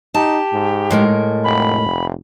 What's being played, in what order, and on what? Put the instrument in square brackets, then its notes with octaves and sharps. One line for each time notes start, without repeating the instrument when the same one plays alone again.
[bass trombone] D#4 [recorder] G4 [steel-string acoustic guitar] A5
[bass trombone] G#2
[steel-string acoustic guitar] A2 G#3 A#4
[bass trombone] F1 [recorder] B5
[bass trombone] F1